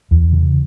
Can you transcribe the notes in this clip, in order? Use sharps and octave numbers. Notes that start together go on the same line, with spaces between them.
E2
C#3